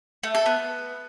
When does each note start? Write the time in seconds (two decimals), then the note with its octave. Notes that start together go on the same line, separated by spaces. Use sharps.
0.23 A3
0.35 A4
0.46 B3